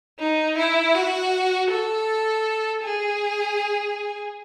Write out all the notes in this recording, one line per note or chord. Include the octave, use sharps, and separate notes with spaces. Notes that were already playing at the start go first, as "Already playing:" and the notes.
D#4
E4
F#4
A4
G#4